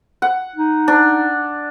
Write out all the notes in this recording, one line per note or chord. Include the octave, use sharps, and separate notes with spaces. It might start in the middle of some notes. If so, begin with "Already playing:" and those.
F#5
D#4
D4